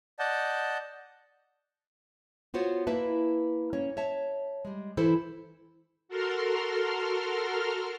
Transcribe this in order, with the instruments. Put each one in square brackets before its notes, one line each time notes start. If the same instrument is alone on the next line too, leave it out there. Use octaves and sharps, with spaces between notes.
[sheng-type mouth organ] D5 D#5 F#5 A5 G6
[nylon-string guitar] B3 F4 F#4 C5 C#5
A#3 E4 B4 E5 A5
A#3 C#4 C#5
C#5 E5 A5
G3 G#3
E3 E4 A4 C5
[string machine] F#4 A4 A#4 C6 F6